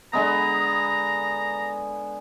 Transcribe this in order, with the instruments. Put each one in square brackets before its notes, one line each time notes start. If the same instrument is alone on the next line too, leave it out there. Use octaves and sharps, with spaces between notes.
[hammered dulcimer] D3 G#3 B3 [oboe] A#5